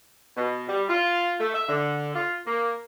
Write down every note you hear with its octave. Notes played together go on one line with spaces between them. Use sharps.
B2
G3
F4
A3
E5
D3
F4
A#3